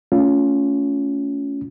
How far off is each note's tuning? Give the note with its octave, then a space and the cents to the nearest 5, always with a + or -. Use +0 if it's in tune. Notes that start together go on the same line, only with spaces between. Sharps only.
A3 +15 C#4 +20 F4 +0